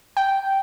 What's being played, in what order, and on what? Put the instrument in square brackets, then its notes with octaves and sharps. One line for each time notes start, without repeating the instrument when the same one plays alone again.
[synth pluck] G5